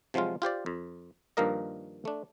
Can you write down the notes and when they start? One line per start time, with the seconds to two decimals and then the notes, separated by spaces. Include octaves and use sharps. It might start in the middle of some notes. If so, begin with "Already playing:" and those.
0.14 C3 F3 F#3 G#3 F4
0.42 F4 G4 C5 D5
0.66 F2
1.37 G2 D#3 F3 A#3 A#4 D#5
2.05 A3 D4